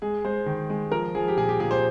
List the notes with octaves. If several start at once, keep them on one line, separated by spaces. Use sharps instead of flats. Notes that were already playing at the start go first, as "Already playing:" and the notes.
G#3 G#4
G#3 C5
D#3
G#3
F3 A#4
F3 G#4
G4
A#2 G#4
G4
A#2 G#4
C5